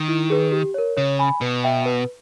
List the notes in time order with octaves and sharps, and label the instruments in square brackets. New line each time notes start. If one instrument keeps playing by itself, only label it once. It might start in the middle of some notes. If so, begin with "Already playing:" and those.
Already playing: [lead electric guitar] D#3
[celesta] E4
G#4 B4
G4
A#4 C#5
[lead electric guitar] C#3 [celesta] C#5
[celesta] G#5 B5
[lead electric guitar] B2 [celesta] B4
[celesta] E5 G5
B4